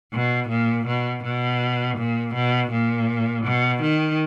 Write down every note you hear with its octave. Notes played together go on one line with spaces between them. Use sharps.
B2
A#2
B2
B2
A#2
B2
A#2
B2
D#3